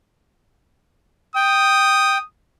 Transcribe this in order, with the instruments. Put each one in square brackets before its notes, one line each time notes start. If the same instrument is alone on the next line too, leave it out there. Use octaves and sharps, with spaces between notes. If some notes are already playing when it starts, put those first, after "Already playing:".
[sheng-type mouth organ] G5 [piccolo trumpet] D#6